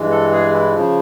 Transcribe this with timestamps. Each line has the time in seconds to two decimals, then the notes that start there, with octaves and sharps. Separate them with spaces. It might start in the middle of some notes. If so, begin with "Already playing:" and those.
Already playing: G2 E3 G#3
0.11 A4
0.33 G#4
0.53 E4
0.74 C#3 F3